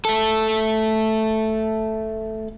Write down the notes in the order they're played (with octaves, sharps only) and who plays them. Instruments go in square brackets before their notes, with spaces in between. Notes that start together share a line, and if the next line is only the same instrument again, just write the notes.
[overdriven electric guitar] A3 A4